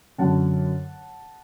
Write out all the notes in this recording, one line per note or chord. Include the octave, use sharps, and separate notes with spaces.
F#2 D3 F#3 F#5 A5